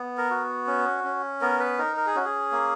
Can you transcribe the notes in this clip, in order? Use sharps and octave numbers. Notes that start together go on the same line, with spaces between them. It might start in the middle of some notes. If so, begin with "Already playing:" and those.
Already playing: B3
A#4
F#4
C#4
C#4
B3 A#4
B4
D#4 A#4
A#4
G#4
C#4 F#4
G#4
A#3